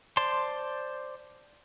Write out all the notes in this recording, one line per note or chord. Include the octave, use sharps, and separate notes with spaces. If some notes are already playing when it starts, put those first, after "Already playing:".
C5 D5 A5 C6